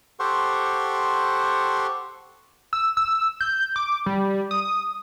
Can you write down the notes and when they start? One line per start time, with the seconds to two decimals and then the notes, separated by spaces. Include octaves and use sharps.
0.20 G4 A4 C5 F#5 C6 C#6
2.73 E6
2.97 E6
3.41 G6
3.76 D6
4.06 G3
4.51 D#6